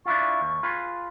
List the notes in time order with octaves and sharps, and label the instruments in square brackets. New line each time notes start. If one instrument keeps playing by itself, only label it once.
[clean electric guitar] D4 E4 F4 [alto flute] C#6
[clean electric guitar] D#2
F4 G#4 B4